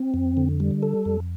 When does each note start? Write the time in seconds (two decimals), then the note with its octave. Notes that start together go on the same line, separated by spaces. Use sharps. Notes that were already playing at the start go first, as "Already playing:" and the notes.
Already playing: C4
0.14 F2
0.37 D3
0.60 G3
0.83 A4
1.05 F2